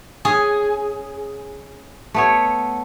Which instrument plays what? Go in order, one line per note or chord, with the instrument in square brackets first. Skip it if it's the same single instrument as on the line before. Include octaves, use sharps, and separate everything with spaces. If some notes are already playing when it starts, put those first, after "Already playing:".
[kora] C#4 [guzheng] G#4
[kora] A3 B3 C#5